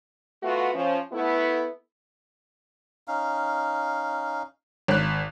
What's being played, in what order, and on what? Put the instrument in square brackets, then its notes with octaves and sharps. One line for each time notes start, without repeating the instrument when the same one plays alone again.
[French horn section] A3 B3 F4 F#4
F3 C#4
A3 B3 E4
[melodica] C#4 D#4 F5
[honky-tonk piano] G#1 F#6